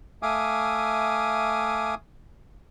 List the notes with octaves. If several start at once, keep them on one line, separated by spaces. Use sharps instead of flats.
A3 E5 F5 G#5 D6 D#6